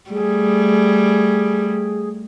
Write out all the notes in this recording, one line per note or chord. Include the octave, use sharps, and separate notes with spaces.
G3 A3 G#4